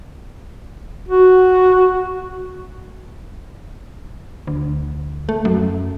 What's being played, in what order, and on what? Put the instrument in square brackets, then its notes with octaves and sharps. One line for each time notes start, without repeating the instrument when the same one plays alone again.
[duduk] F#4
[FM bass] D2
A3
F#2